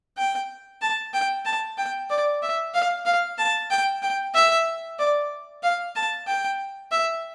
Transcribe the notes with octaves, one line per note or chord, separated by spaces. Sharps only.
G5
A5
G5
A5
G5
D5
E5
F5
F5
A5
G5
G5
E5
D5
F5
A5
G5
E5